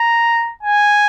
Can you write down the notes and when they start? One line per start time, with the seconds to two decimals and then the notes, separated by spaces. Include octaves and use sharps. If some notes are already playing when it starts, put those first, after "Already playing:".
Already playing: A#5
0.63 G#5